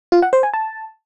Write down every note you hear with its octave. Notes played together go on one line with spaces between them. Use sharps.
F4
F#5
C5
G#5
A5